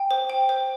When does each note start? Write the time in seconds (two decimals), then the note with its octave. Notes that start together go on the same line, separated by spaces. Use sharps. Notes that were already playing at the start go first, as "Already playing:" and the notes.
Already playing: G5
0.11 C5
0.30 G5
0.49 C5